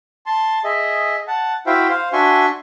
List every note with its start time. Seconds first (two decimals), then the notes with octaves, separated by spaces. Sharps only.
0.26 A5 C6
0.64 G#4 D#5 E5
1.28 F#5 A5
1.67 E4 F#4 C5 E5 F5 G5
1.90 C5 F5
2.13 D4 F#4 E5 G#5 C6 C#6